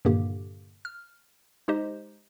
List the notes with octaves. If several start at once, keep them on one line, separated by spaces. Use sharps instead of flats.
G2 A#2 D3 D#3 A#3 G4
F6
G#3 D#4 G4 C5 D#5